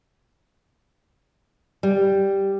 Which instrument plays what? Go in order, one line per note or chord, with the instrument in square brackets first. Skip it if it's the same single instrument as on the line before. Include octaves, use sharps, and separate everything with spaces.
[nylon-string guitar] G3